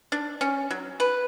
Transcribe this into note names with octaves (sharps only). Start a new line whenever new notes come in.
D4
C#4
F#3
B4